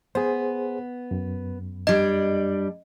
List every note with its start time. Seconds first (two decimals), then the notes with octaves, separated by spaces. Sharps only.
0.15 B3 G#4 C5
1.11 F#2
1.87 G3 D4 D#5